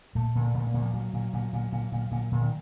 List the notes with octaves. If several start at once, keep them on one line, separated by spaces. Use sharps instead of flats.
A#2 A3
A#2
A3
A#2
A#3
A#2
F3
A#2 F#3
A#2
A#2
A#2
A#2
A#2
A#2
A#2
D#3